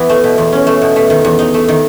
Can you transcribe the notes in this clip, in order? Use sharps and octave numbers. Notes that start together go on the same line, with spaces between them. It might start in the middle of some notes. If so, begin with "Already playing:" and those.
Already playing: E3 B3 E4
A3
B2
E2
C#4
A3
B2
A3
D#3
E2
D#4
A3
D#3